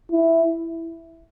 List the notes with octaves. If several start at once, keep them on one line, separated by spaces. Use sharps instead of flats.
E4